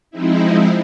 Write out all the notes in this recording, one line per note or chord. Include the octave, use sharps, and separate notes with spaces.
F3 G#3 C4 D#4 E4